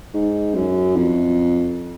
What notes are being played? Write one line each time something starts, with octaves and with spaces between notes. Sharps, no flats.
G#2
F#2
F2